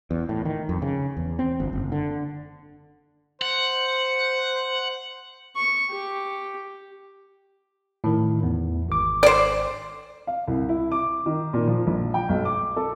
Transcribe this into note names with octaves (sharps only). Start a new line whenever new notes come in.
E2
A2
D#3
F2
C#3
E2
C4
G1
F#1
D3
C5 F#5
C#6
G4
A2 D#3
E2
G#1 D6
C5 D5
F5
C2
E4
D6
D#3
A#2
F3
A#1
G5
B1
D6
A4